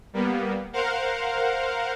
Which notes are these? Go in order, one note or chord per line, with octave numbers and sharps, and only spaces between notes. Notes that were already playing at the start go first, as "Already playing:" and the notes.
G3 A#3 B3
A#4 C5 F5 F#5